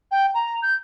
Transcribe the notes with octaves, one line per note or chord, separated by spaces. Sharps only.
G5
A#5
G6